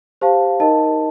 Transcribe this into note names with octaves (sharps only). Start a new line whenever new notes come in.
G4 C5 F5 A5
D#4 A#4 D#5 A5